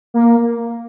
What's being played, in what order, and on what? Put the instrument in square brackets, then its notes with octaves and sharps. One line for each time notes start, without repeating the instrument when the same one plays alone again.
[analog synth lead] A#3